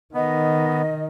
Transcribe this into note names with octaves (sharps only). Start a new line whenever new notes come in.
D#3 B3 D#5